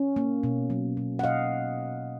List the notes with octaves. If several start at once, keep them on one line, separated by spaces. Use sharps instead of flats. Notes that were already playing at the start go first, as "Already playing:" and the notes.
Already playing: C#4
A#3
B2
F#3
B2
F#5
B2 D#5 F5